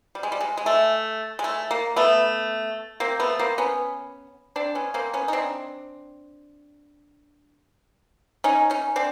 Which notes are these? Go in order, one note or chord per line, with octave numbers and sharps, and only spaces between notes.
G3
G#3
G3
G#3
G#3
A3
G#3
A3
A#3
A3 B3
A#3 C4
A3 B3
A#3 C4
B3 C#4
C4 D4
B3 C#4
A#3 C4
B3 C#4
D#4
C4 D4
C#4 D#4
C#4 D#4
C4 D4